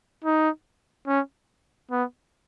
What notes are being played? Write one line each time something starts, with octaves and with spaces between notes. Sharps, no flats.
D#4
C#4
B3